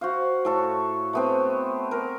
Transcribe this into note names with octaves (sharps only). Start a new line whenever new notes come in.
F#4 C5 F5
A2 A4 C#5
A3 B3 C4
A#4